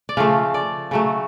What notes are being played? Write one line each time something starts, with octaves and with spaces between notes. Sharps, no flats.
D5
C#3 F3 A3 F5
D5
C#3 F#3 A3